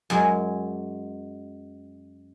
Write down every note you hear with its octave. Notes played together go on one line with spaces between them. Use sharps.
F#2 G#3